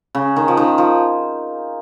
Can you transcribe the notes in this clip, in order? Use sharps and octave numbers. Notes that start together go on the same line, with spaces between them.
C#3
D#3
F3
D#3
F3